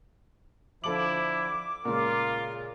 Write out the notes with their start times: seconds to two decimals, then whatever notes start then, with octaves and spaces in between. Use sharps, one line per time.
0.84 D3 F3 E4 A4 D6 F#7
1.85 A#2 C#3 G#3 F4 A#4